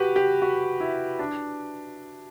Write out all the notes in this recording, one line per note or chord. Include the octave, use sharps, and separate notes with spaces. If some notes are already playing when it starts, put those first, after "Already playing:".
Already playing: F#4 G4 B4
G4
F#4
E4
D4